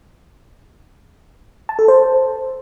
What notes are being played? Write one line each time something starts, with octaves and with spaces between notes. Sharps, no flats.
A5
A4
C5